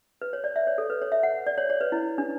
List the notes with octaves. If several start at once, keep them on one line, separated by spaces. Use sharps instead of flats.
B4
C#5
D5
E5
C#5
A4
B4
C#5
E5
F#5
D5
C#5
C#5
B4
E4
D4